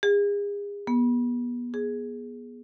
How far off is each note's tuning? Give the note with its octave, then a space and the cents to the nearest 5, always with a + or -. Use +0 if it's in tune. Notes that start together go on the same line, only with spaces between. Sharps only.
G#4 -40
B3 -30
G#4 +5